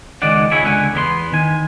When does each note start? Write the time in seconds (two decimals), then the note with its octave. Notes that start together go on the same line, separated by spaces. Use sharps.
0.22 C#2 D#3 G#3 D5 F#5
0.51 E4 F4 G#4 C#5 D#5 E5
0.63 C#2 D3 F#5 G#5
0.94 E2 B3 A#4 C6
1.32 D#3 G#5